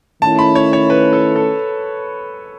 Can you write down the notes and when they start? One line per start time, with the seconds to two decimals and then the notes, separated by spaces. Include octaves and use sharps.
0.22 D#3 A3 C#4 E4 A5
0.39 B5
0.55 C#5
0.73 C#5
0.90 B4
1.13 A4
1.36 A4